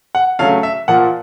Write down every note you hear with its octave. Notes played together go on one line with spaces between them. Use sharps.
F#5
C#3 F#3 A3 C#4 F5
E5
A#2 F3 A#3 F#5